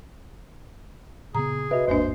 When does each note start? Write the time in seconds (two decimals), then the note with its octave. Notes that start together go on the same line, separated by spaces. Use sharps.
1.35 A#2 C#3 B3 G#4 A#5
1.71 C3 F#4 B4 D#5 E5
1.88 G1 D#2 G#2 A#3 D4 C5